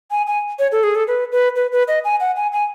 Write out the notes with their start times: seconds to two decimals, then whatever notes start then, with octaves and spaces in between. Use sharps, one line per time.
0.11 G#5
0.27 G#5
0.59 C#5
0.72 A4
0.83 G#4
0.95 A4
1.07 B4
1.32 B4
1.56 B4
1.72 B4
1.88 D#5
2.04 G#5
2.20 F#5
2.36 G#5
2.52 G#5